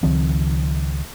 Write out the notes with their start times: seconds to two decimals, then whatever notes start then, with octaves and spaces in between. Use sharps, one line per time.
0.03 C#2 D#3 F3 C4